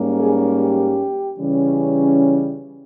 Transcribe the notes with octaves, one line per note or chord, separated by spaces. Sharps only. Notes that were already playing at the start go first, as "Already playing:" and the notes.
Already playing: G#2 G3 A#3 C#4
G#4
G4
C#3 E3 G3 C#4